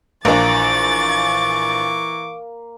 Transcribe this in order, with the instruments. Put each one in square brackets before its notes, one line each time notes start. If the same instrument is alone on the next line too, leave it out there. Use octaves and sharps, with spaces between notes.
[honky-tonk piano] A#1 D4 [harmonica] E3 C#6 D6 [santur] A#3 [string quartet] A6